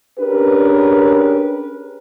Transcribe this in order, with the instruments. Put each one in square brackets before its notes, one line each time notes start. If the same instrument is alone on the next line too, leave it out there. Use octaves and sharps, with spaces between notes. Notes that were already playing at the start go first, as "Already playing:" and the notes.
[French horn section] C#4 D4 G4 G#4 A#4 B4